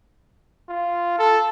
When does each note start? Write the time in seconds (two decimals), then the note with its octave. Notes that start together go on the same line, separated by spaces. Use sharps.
0.69 F4
1.19 A4